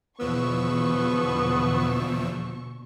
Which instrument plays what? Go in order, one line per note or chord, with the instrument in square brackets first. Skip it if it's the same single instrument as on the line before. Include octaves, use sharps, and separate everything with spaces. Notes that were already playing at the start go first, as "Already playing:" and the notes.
[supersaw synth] E2 F3 E6 [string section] B2 D3 C#6 [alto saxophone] B3